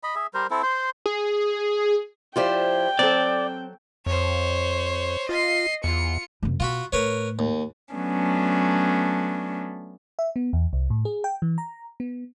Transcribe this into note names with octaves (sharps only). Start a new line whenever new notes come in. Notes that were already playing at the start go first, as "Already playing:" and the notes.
D#5 B5
G#4 E5
G3 A#4 C5
C4 E4 A4
C5 C6
G#4
F3 E4 F4 G4 C5 D5 G5
F#3 C4 A4 D5
F2 C5 C#5
F4 D#5 C7
E2 F4 C#7
F#2 C3
B2 F4 F#4 B5
A2 A#4 B4 C#5
D#2
F#3 A3 B3 C#4 D4
E5
B3
E2
C2
A2
G#4
G5
E3
A#5
B3